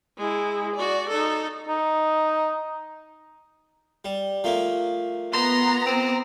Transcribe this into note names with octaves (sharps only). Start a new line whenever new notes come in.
G#3 E4
F#4 D5
D#4 A4
D#4
G3
F3 A3 A#3
B3 A#5 C6
C4